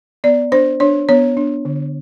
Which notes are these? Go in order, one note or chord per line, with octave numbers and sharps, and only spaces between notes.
B3 D5
D4 C5
D4 C#5
B3 C#5
D4
D3